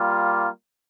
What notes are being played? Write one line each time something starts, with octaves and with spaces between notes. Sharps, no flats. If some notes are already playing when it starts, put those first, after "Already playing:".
Already playing: G3 A#3 F4